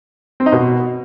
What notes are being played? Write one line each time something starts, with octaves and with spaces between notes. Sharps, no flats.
C4
D#4
B2